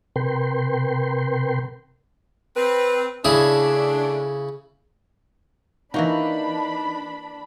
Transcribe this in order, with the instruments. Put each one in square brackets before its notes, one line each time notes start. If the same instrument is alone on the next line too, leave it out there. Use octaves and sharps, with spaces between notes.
[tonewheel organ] C3 A#4 B4 G5 C6
[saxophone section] C4 B4
[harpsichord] C#3 E4 G#4 [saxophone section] A3 D4
[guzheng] E3 A#3 F#4 [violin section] D4 B5 [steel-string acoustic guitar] D#4